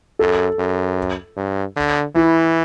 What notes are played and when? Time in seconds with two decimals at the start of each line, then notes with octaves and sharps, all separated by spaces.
0.19 F#2 A4
0.59 F#2
1.36 G2
1.76 D3
2.15 E3 E4